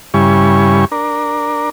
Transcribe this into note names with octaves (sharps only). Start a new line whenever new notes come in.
G2 C#3 G3 E4 G#5 C#6
D4 A#4